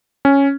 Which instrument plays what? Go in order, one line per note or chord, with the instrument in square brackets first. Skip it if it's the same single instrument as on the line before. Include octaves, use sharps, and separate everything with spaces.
[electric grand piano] C#4